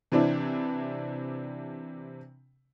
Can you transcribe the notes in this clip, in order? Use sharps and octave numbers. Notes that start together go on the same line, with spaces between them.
C3 E3 C4 D4 E4